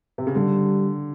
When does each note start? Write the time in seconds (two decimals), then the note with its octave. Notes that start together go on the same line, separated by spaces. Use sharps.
0.18 C3
0.27 C#3
0.35 D3 G3